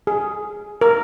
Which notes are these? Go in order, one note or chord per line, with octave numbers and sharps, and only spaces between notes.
G#4
A#4